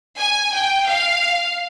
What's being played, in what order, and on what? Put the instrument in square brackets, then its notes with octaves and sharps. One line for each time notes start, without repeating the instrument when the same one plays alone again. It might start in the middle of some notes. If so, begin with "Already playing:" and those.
[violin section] G#5
G5
F5